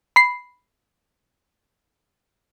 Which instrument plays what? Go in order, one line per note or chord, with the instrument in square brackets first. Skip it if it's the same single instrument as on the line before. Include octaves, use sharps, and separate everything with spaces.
[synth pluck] B5 C7